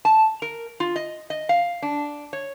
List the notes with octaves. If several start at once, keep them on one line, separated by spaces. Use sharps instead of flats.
A5
A#4
F4
D#5
D#5
F5
D4
C#5